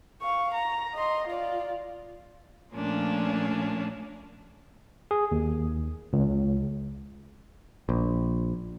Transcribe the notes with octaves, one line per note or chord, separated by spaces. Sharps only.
F5 C#6
A#5
D#5 C6
F4 D5
A#2 F3 A3 A#3 C#4 D4
G#4
D#2
C#2
A#1